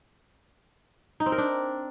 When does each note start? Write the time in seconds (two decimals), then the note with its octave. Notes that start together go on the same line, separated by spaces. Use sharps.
1.20 D#4
1.26 C4
1.32 A#4
1.38 D4